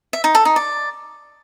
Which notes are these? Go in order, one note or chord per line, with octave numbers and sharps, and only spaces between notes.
E5
D#4
A4
D#4
D5